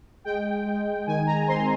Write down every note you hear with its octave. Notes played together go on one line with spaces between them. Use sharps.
G#3 G5
G#3
D#3 G#5
A#5
C4 C6